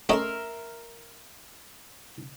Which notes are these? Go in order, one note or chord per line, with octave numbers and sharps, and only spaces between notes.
A3 C#4 A#4 D#5 E5 C6